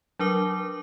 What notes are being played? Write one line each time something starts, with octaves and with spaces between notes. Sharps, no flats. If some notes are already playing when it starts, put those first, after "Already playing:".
F#3 D4 A#4 D6